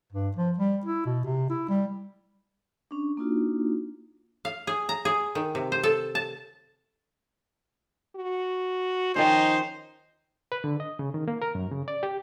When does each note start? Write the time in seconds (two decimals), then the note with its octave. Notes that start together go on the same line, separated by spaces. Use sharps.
0.12 G2
0.36 F3
0.58 G3
0.85 E4
1.06 B2
1.24 C3
1.50 E4
1.69 G3
2.91 C#4 D4
3.17 A#3 D4 D#4 F4 F#4
4.45 F5
4.67 G#4
4.89 A#5
5.05 G#4
5.35 D#3
5.55 C3
5.72 C5
5.83 A4
6.15 A5
8.16 F#4
9.16 D#3 F3 C#4 D#4 C5
10.52 B4
10.64 D3
10.80 D#5
10.99 C#3
11.14 D#3
11.28 A#3
11.42 A#4
11.55 F#2
11.71 C#3
11.88 D5
12.03 G4